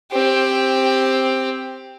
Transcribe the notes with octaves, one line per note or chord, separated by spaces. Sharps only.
C4 G4